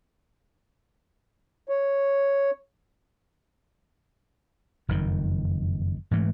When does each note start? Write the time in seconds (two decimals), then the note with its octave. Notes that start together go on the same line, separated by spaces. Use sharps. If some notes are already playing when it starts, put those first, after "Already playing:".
1.69 C#5
4.88 F#1 F2 G#2 D#3
6.11 G#2 E3 A3